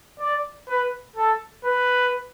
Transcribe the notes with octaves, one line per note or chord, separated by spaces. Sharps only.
D5
B4
A4
B4